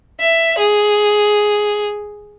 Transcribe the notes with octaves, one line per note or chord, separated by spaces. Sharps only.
E5
G#4